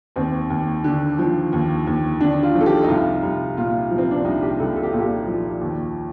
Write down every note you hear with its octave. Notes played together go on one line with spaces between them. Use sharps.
D#2 C4
D#2
D3
F3
D#2
D#2
D3 D4
F4
F3
A4
G4
D#4
C2 F4
C2
A#2 F4
F3
C4
D4
C2 D#4
G4
C2 A4
A4
G4
A#2 F4
G4
F3
D#2